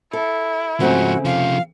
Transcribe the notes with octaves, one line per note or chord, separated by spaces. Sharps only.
E4 A4
G#2 C#3 F3 A3 C4 F#4
C3 F3 F5